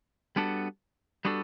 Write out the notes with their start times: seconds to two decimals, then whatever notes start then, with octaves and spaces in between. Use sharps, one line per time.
0.36 G3 B3 D4 F#4 A4
1.25 G3 B3 D4 F#4 A4